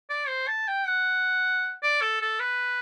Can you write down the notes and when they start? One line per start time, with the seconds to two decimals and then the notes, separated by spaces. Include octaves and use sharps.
0.10 D5
0.28 C5
0.47 A5
0.68 G5
0.86 F#5
1.83 D5
2.01 A4
2.22 A4
2.40 B4